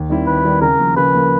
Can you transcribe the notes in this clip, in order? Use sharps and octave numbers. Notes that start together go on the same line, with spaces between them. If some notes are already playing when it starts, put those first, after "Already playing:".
Already playing: D#2
D#3 G3 C4 E4
D#2 B4
D#3 G3 C4 E4
C#3 A#4
F3 A#3
C#3 B4
F3 A#3